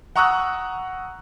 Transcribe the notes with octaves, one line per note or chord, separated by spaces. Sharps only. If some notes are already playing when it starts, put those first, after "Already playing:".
F#5 A#5 C#6 D#6 E6 F#6